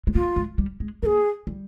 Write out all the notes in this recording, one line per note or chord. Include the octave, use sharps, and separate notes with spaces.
G#3
A#3 F4
G#3
G3
G#3
A#3 G#4 A#4
G3